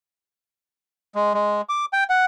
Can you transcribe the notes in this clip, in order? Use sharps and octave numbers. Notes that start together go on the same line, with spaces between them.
G#3
G#3
D6
G5
F#5